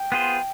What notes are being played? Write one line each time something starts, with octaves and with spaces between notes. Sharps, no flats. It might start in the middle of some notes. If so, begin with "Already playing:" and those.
Already playing: G5
B3 F4 G#4 C5